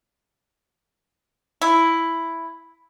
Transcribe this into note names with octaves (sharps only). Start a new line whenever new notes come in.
E4